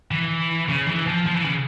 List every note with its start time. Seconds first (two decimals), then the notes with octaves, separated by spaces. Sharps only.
0.11 E3
0.69 C#3
0.88 E3
1.07 F3
1.26 F3
1.34 E3
1.44 C#3